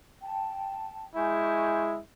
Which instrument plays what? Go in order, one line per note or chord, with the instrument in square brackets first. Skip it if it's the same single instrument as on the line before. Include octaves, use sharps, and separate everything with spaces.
[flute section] G5 A5
[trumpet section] G#3 E4 [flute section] G#5 C#6 G6